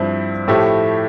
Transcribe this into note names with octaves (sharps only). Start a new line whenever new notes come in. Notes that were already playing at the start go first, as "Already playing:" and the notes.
Already playing: G2 F3 C4 E4
A2 F3 A3 E4 G4